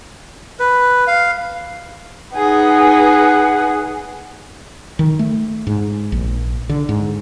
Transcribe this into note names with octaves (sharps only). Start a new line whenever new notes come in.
B4
F5
D#4 G#4 B4 F#5
D#3
A3
G#2
A#1
D3
G#2